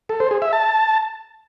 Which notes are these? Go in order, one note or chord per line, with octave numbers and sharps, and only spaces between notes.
A4
C5
G#4
E5
A5